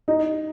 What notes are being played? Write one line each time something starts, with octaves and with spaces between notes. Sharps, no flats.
D#4